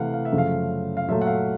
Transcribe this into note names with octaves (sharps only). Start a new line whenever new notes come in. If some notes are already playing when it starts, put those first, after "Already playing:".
Already playing: C3 E3 A3 F5 F#5
F5
E5
F#2 C#3 F3 A3
F5
F5
A#2 F#3 A3 E5
F#5
F5